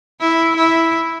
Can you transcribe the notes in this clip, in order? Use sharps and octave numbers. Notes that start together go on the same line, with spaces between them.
E4
E4